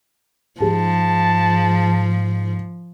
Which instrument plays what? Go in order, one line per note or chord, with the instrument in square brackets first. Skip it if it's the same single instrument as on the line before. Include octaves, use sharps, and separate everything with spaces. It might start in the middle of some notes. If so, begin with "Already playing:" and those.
[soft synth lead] G#2 [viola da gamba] F3 [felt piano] G#4 [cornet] A5